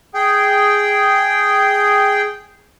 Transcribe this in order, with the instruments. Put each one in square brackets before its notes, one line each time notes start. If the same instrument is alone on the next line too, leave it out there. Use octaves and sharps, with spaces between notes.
[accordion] G#4 G5